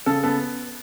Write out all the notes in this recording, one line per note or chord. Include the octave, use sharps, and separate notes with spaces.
C#3 A4
B3 A4